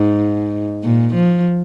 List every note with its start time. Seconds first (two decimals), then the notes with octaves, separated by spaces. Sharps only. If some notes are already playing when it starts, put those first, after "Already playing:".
Already playing: G#2
0.84 A#2
1.15 F3